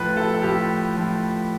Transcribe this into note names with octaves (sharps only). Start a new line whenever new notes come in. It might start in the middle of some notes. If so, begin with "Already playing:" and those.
Already playing: A2 F3 B4
A4
A4
A2 F3 G4
A2 F3